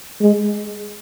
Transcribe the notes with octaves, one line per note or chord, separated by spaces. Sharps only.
G#3